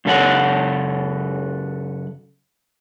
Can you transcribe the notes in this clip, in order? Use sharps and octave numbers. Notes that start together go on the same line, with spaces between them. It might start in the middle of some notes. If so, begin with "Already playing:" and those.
F#2 C#3 A4 C#5 F#5